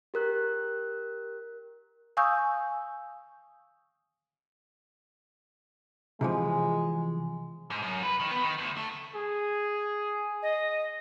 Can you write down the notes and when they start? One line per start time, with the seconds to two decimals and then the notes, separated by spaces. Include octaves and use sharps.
0.14 G4 A#4 F#6
2.17 F5 G#5 C#6 D#6 E6 G6
6.21 C3 E3 F3 G#3
7.70 G#2
7.82 F#2
8.03 B4
8.20 D#3
8.31 B3
8.43 D#3
8.58 D2
8.77 A3
9.15 G#4
10.42 D#5